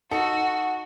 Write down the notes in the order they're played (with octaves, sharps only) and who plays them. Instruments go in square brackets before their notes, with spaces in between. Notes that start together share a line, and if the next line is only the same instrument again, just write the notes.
[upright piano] D#4 A4 C#7 [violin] F#4 [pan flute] F#5